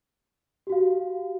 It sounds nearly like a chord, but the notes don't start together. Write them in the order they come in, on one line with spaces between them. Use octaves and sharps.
G4 F#4 F5